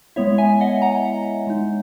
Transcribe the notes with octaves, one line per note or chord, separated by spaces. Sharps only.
G#3 B3 E4 C#5 E5
E5 G#5
D#5 F#5
F#5 A#5
G#3 D#4